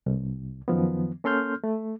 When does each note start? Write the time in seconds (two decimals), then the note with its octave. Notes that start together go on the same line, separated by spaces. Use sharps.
0.06 C2
0.68 F#2 D#3 F3 B3
1.24 A#3 C#4 A4 C6 F6 G6
1.64 A3